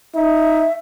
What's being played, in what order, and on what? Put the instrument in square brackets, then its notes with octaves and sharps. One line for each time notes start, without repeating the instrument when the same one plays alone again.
[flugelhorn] D#4 [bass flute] E5